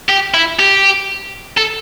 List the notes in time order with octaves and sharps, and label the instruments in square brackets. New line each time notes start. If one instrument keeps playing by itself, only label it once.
[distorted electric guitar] G4
E4
G4
A4